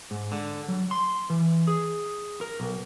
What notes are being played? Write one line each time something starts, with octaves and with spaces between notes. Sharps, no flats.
G#2
D3
F#3
C6
E3
G#4
A#4
B1